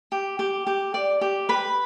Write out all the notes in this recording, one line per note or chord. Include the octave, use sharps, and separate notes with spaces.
G4
G4
G4
D5
G4
B4 B5